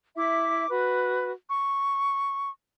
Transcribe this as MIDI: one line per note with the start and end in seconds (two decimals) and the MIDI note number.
0.16 0.67 64
0.16 0.67 76
0.16 0.67 86
0.69 1.31 66
0.69 1.31 71
1.48 2.48 85